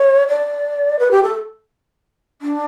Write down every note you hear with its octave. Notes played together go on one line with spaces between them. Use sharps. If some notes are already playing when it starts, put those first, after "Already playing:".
Already playing: C#5
D5
B4
G4
A4
D4